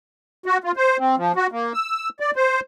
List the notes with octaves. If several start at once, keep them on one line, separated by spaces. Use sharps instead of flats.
F#4
F4
C5
C4
F3
F#4
A#3
E6
D5
C5